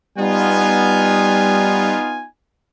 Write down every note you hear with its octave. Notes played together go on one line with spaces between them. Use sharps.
G3 B3 D#4 F4 G#5